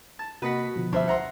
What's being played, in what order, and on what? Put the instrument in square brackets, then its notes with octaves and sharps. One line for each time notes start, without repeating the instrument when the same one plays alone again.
[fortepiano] A5
[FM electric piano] C3 A#3 B6 [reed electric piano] F#4 [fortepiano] B4 D#5 F#5
[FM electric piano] B2 D3 F3
[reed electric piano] C#2 C5 E5 [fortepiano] G2
[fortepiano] F#5 A#5 C6